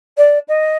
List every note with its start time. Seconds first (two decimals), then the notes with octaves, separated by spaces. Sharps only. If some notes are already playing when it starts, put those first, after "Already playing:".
0.17 D5
0.48 D#5